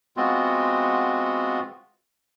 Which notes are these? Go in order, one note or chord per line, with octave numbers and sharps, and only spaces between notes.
G#3 B3 C4 F4 F#4